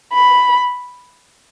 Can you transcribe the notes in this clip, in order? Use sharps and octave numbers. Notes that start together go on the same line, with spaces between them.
B5